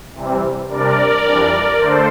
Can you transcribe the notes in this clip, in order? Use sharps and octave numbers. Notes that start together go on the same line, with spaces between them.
C3 E3 G3 C4
C3 G3 D4 A#4 D5
F2 E3 G3 D4
D3 A3 D4 A4 C5